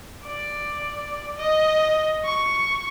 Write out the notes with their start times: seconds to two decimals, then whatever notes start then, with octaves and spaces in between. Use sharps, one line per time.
0.25 D5
1.37 D#5
2.25 C#6